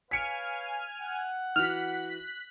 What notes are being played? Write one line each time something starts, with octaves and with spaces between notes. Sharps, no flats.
B4 C#5 F5 G#5 F6 B6 C#7 D7
F#5
E3 F#4 F6 F#6 B6